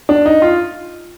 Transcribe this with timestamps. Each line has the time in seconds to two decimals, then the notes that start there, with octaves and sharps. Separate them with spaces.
0.09 D4
0.26 D#4
0.42 F4